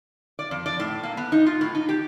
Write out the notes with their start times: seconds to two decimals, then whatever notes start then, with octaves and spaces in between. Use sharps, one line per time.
0.39 D5
0.51 F2
0.66 D5
0.80 A2
1.03 A#3
1.17 B3
1.32 D#4
1.46 F4
1.61 A2
1.75 D#4
1.89 G4